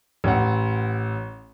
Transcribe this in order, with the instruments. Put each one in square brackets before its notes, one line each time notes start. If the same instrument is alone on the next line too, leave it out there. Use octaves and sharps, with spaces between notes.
[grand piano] A1 F#5